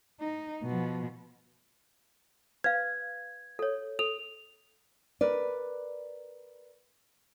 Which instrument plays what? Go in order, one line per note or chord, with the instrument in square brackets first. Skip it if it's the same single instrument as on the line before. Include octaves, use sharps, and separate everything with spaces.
[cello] D#4
B2 F3
[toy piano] B4 F5 [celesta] G#6
[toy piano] A4 C#5
[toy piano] A4 [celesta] F7
[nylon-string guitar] A#4 B4 D5